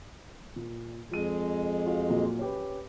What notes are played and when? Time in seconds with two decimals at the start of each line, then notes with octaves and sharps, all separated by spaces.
0.56 A#2
1.11 F2 F3 G#3 D#7
1.86 F4 F#4
2.10 A#2 F#3 A#3
2.39 C#4 G4 B4